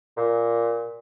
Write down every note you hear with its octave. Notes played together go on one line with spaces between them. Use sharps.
A#2